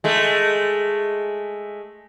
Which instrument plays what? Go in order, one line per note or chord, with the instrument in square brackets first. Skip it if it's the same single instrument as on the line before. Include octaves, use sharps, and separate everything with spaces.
[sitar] G#3 A3